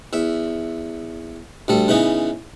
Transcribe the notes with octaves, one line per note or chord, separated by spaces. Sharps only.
E2 E5
D2 G3 A4
C#3 E3 B3 D#4